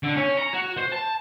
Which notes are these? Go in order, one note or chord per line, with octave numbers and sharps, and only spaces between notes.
D3
C#4
A#5
F#4
C5
A5